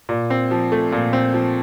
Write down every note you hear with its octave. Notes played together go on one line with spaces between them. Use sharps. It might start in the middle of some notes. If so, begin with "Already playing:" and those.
A#2
C4
F3
A3
A#2
C4
F3